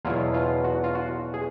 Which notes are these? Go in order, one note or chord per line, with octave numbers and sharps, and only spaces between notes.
E2 B2 F#3 B3 E4 F4
F4
F#4
F4
F#4
G#4